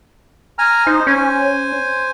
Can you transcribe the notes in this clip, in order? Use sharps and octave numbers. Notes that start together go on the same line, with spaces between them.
G#5 A#5 F6
D#4 C5
C#4 C5 G#5